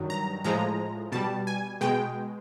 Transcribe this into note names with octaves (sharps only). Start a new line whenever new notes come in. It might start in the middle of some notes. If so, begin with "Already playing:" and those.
Already playing: G2 D#3 F#3
A#5
A2 F3 G#3 A#5
B2 G3 A5
G#5
B2 G#3 G5